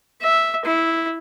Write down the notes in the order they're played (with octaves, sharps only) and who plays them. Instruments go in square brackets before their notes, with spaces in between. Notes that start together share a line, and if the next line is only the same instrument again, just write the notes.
[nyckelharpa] E5
E4